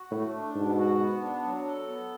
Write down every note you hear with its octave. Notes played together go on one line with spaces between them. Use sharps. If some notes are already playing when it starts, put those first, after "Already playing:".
Already playing: F#4
A2 A3
D4
G#2 B2
F#4
B3
D4
F#3
A4
B3